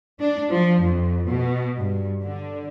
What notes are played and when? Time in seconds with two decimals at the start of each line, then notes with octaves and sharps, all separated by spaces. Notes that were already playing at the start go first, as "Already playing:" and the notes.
0.19 D4
0.50 F3
0.83 F2
1.26 B2
1.78 G2
2.22 D3